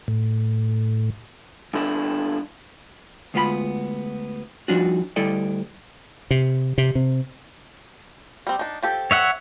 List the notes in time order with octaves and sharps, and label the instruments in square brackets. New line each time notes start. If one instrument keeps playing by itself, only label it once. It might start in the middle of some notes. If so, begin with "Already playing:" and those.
[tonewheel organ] A2
[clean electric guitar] G2 D3 E4
[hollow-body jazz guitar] D2 G#3 B3 F4 F5 B5
F3 G3 D4 D#4 F4 F#4
D2 G3 E4 A4 D5 D#5
[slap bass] C3
C3
C3
[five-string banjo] G3 C4
D4 D#4
F3 G4 A4
[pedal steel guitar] C#5 E5 F#5